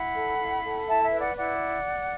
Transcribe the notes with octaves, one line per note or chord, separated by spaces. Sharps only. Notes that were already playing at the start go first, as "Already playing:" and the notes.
Already playing: E4 F#5 B5
A4
E4
A4
E4 E5 A5
E5
B4
D5 F#5
E4 D5 F#5